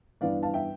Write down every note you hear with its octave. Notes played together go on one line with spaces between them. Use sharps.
G2 E3 B3 D4 D5 F5
F5 A5
E5 G5